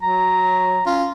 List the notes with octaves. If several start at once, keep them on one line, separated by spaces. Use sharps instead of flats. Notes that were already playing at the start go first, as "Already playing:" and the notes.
F#3 A#5
C#4 F4